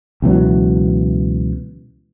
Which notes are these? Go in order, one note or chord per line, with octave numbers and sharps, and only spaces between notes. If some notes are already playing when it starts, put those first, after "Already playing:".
C#2 B2 E3 F#3